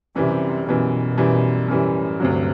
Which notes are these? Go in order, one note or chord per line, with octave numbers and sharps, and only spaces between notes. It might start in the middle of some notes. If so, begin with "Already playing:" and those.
F#2 C3 E3 G3
F#2 B2 E3 G3
F#2 E3 G3
F#2 A2 E3 G3
D2 G2 C3 F#3